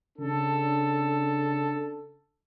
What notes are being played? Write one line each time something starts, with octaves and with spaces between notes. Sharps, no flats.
C#3 D4 A4